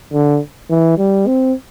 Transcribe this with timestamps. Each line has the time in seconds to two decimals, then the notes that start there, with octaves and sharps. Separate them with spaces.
0.13 D3
0.70 E3
0.98 G3
1.27 C4